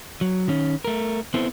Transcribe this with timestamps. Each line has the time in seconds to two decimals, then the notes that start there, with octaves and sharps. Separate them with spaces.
0.21 F#3
0.48 D#3 C#4
0.85 A3 A#4
1.34 B3 C4 E4 A4 C5